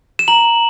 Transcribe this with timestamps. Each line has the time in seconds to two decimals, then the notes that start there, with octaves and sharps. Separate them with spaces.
0.19 E7
0.28 A#5 F#7